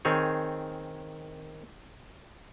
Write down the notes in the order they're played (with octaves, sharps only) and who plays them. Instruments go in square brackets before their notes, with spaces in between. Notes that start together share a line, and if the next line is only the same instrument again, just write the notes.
[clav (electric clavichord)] D#3 C4 G#4 C#5